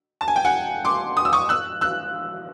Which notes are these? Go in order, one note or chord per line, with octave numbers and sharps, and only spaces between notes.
A5
G#5
G5
F#5 G#5
C6 D6
D#6
E6
C#6 D#6
E6 F#6
E6 F#6